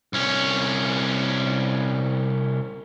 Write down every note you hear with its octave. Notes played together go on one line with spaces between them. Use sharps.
C2 C#4